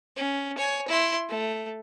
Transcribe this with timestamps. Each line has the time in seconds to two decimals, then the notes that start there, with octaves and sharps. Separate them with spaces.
0.16 C#4
0.57 C#5 G#5
0.88 E4 C6
1.29 A3